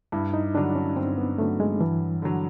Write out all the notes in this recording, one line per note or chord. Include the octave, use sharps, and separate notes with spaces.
G2 E4
D#4
D3 F#3 D4
C#4
G2 C4
B3
D3 F#3 A3
G#3
G2 E3
D3 F#3